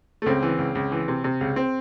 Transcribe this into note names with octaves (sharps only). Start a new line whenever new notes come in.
A3
C#2 C4
E3
C#2
C#2
E3
C3
C3
C#2
C4